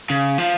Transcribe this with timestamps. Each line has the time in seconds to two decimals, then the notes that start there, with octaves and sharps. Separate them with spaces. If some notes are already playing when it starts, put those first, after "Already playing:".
0.10 C#3
0.38 F3